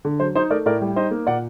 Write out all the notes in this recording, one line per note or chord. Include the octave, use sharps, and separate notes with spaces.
D3
F#3 C5
D#4 C5
A3 A#4 D5
A2 A#4 D5
G3
D#4 C5 D#5
A#3
A#2 D5 F#5